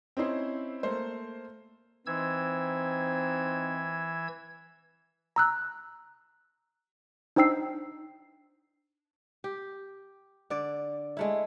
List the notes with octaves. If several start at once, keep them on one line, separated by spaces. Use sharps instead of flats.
C4 C#4 D#4 E4 C5
A3 A#3 C5
E3 C4 D#4 E6 G#6
A#5 E6 F#6
D4 D#4 C5 G5 E6 C7
G4
D3 D5
G#3 A3 E4